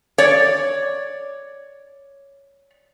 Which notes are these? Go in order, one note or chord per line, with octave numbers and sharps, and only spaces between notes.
C#5 D5